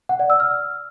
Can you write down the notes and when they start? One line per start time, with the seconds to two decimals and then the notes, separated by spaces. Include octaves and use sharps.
0.09 F#5
0.20 D5
0.30 E6
0.40 F6